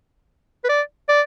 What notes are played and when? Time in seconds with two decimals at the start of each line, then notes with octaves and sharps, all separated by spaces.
0.64 B4
0.69 D5
1.09 D5